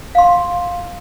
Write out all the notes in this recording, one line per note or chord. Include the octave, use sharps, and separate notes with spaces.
F5 C6